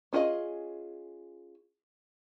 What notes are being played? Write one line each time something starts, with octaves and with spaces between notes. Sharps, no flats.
C#4 F4 G#4 A4 D#5